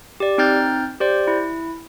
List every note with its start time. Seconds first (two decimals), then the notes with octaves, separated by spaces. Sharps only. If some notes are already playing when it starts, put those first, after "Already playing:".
0.20 G4 D5
0.38 C4 D#4 G5 F6 G6 A6
1.00 G4 C5 D5
1.27 E4